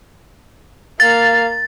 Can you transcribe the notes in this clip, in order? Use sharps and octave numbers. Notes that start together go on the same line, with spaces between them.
A#3 F5 A6